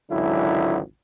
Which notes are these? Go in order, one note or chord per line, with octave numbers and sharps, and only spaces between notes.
G#1 C#2 D3 F#3 E4